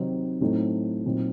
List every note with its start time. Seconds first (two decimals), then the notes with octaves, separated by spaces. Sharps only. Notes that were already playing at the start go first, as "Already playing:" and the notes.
Already playing: C3 D#3 F#3 C4 D#4
0.41 A2 F#3 A3 C4 D#4
1.05 A#2 F#3 C4 D#4